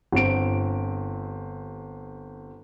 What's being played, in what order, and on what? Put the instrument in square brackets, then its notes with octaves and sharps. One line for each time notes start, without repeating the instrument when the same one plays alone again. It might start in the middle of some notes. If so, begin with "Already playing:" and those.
[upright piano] G1 C4 D7